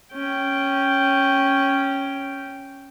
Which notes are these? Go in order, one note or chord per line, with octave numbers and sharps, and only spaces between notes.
C#4 G5